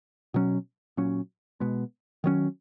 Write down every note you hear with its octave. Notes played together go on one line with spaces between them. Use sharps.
B2 F#3 C#4
A#2 F#3 C#4
B2 G#3 B3
D#3 F#3 C#4